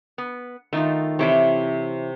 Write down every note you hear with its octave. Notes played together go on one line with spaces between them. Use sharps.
B3
D#3 A3 D#4 F4
C3 E3 E4 A4 C#5 D6